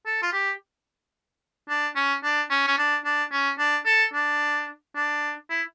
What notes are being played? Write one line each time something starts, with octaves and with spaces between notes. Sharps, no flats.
A4
F4
G4
D4
C#4
D4
C#4
C#4
D4
D4
C#4
D4
A4
D4
D4
E4